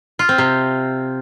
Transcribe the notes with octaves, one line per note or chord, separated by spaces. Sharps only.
F4
C4
C3